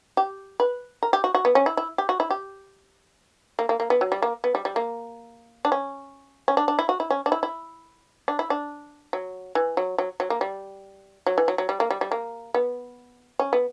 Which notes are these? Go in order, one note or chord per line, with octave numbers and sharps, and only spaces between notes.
G4
B4
A#4
G4
F#4
F#4
B3
C#4
E4
E4
G4
F#4
E4
G4
A#3
A#3
A#3
B3
F#3
G3
A#3
B3
G3
G3
A#3
D4
C#4
C#4
D4
D4
E4
F#4
E4
C#4
D4
E4
E4
D4
E4
D4
F#3
E3
F#3
F#3
F#3
A#3
G3
F#3
E3
F#3
F#3
G3
A#3
G3
G3
A#3
B3
C#4
B3